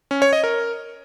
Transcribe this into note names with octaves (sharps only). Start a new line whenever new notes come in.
C#4
C#5
D#5
A#4